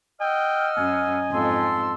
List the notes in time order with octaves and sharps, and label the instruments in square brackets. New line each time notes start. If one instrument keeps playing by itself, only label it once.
[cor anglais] D#5 [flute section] F#5 E6 F6 [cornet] G5
[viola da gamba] F#2 [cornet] G#5
[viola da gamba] F2 G#2 F3 [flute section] A5 C6 E6